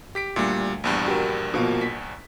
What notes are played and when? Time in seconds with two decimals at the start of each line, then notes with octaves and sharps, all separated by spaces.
0.15 G4 B6 D7
0.36 D2 A#2 G3
0.84 A#1 E2 G2
1.06 F#4 G4 A#4
1.54 B2 F3 A#3
1.81 B6